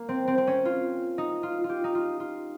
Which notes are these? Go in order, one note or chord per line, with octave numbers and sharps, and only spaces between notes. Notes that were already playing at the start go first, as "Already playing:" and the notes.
Already playing: A#3
C4
C4
C4
C#4
F4
D#4
F4
F4
G4
D#4
F4
F4